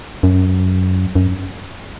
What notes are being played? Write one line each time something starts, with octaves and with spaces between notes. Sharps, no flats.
F#2
F#2